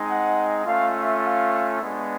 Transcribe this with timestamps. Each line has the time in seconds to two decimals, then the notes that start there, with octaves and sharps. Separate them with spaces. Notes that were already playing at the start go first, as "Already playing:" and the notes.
Already playing: G#3 C4 D#4
0.08 F#5
0.66 A3 C#4 F4 F5
0.95 E5
1.23 F5
1.80 G#3 B3 D4